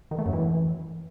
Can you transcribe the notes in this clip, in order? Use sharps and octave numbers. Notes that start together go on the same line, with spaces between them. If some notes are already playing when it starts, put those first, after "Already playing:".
D#3
A3
F#2
E3